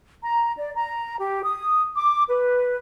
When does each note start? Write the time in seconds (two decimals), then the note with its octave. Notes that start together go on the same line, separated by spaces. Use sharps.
0.22 A#5
0.57 D5
0.75 A#5
1.19 G4
1.43 D#6
1.95 D6
2.28 B4